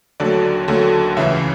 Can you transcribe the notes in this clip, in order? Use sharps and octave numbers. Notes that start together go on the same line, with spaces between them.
D#2 D3 F#3 A3 D5
D#2 D3 F#3 A3
C#2 C#3 E3 E5